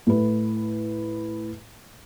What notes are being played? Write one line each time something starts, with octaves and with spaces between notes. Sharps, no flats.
A2 B4